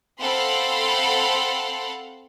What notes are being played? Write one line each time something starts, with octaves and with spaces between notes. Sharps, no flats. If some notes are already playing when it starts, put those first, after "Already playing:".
C4 A4 F5 F#5 B5 C6